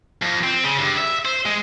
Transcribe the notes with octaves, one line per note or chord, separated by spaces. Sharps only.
F2
C4
C#3
G2
E5
C5
G#3